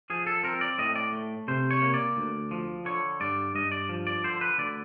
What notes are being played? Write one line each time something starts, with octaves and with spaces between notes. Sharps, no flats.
F3 G#4
A4
C4 A#4
D5
A2 D#5
D5
A3
C3 C5
C#5
A#3
D5
D2
F3
D3 C#5
G2 D5
G2 D#5
D5
F3
D5
D3 C5
B4
D2 D5